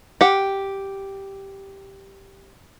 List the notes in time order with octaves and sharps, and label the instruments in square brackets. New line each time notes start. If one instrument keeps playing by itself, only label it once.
[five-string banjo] G4 F#5